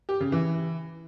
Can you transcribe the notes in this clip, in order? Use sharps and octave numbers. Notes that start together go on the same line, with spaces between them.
G4
C#3
E3